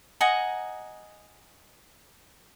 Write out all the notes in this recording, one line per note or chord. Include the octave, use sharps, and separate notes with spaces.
D#5 F#5 G#5 A#5